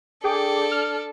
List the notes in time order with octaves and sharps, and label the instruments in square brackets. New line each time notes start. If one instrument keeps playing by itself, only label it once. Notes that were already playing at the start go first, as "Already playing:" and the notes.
[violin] D4 A4 [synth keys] G#4 G5 D6
[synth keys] F6